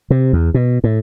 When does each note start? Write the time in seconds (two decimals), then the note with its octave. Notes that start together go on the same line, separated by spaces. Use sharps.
0.10 C3
0.33 E2
0.54 B2
0.84 A2